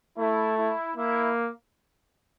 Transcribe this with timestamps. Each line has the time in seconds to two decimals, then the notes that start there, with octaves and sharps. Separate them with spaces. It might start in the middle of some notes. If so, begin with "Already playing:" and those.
0.18 A3 E4
0.57 E4
0.95 A#3 E4